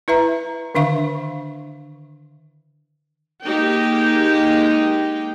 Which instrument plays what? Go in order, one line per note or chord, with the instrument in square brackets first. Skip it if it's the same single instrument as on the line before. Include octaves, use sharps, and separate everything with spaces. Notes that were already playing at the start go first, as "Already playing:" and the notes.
[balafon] E4 B4 E5 A#5
D3 D#3 D4 E5 F5 C#6
[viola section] G#3 A#3 D#4 G4 G5